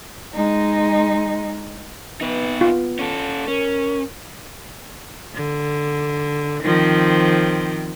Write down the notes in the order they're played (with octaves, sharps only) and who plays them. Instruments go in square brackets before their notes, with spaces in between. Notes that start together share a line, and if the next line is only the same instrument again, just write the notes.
[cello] G#3 D#4
[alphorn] B3 [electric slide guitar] D#4 B4
[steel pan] F4
[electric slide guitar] C#4 A4
[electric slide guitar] C#4 [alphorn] A#4
[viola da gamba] D3
D#3 F3 C4